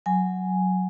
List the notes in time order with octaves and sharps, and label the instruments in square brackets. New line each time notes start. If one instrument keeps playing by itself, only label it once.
[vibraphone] F#3 G#5